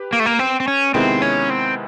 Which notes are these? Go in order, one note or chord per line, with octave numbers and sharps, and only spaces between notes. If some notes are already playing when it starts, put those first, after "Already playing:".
Already playing: G4 B4
A#3
A3
A#3
C4
C4
C#4
C3 D#3 G#3 B3 C4 E4
C#4
C4